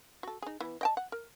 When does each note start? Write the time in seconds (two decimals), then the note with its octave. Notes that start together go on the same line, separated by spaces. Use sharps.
0.23 F#4 A4
0.42 D#4 G#4
0.60 E3 B3
0.81 D#5 G5 A5
0.97 F#5
1.12 A#4